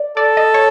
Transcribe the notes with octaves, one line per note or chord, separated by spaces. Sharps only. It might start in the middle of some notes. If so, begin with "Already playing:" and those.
Already playing: D5
A4 D5
D#5
C#5